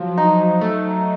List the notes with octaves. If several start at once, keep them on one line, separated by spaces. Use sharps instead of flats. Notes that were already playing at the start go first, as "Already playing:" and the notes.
Already playing: F3 F#3
D#4
F#3 A3